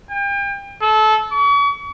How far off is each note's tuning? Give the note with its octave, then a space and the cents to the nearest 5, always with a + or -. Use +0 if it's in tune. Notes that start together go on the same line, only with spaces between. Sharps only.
G5 +35
A4 -25
C#6 +45